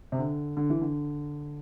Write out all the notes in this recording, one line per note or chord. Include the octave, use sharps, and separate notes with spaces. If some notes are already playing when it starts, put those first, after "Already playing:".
C3
D3
D3
E3
D3